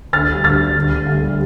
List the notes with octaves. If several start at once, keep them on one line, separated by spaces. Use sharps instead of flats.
D2 F6 A6
D3 G3
D2 F6 A6
D3 G3
D2
D3 G3
D2
D3 G3